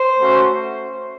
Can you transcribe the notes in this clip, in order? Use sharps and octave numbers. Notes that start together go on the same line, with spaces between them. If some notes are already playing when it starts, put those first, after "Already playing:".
Already playing: C5
A3 C#4 F#4